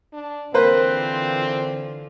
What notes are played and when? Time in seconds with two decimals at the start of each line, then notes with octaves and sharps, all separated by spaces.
0.13 D4
0.54 D3 E3 A#3 C4 F4 B4 C5